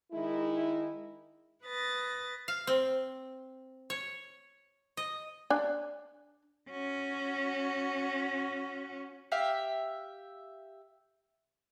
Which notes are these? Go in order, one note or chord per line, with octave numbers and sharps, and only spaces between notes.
D#3 G#3 D#4 E4
B4 D#6 A6 A#6
F5
C4
C#5
D#5
D4 G#5
C#4 F#4
G4 E5 F5